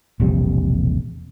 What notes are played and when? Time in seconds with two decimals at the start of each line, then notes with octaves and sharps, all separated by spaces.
0.20 E1 A#1 C3 G3